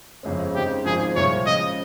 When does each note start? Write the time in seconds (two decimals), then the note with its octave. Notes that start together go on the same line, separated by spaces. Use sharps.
0.23 G1 F2 C#3 G#3 C#4
0.54 C#3 G#3 C4 D#4 G4
0.85 G#1 G#2 F3 C4 D#4 G#4
1.16 C2 A#2 F3 G#3 C#5
1.46 C#3 F3 G#3 D#5